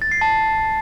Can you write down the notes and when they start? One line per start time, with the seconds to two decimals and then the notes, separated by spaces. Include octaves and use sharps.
0.02 A6
0.11 C7
0.21 A5